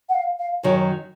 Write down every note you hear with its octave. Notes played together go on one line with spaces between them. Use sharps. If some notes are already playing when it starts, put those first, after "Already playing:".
F#5
F5
F5
F#2 D#3 F#3 C#5